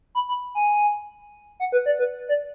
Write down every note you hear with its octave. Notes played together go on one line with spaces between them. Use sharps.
B5
B5
G#5
F#5
B4
D5
B4
D5